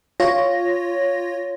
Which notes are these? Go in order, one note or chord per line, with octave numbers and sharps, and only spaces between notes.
F4 C#5 A#6